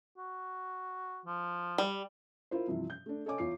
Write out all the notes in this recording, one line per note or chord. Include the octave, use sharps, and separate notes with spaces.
F#4
F3
G3
E4 F4 A#4 C5
G2 C3 E3 F3
G6
A3 D4
A4 C#5 D#5 G#5 D6
E2 F4 C#5 D6 C7